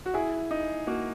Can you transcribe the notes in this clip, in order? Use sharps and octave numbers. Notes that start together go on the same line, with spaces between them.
F#4
E4 G#4
D#4
A#3 F#4